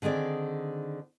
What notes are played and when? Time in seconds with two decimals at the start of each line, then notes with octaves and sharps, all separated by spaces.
0.02 D3 D#3 C4 G#4 D5